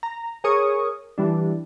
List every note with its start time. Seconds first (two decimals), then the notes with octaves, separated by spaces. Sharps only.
0.03 A#5
0.44 G#4 A#4 C#5 C#6 D#6
1.18 E3 G3 D4